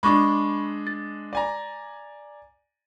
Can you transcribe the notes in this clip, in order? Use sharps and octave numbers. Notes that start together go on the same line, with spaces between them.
G#3 D4 B5 C#6 D6
A6
D5 G#5 A#5